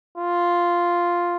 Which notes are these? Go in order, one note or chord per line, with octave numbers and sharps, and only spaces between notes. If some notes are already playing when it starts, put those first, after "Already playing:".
F4